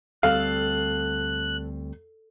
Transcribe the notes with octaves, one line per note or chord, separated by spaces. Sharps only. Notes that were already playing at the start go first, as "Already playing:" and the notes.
D2 G3 C4 A4 F5 F#6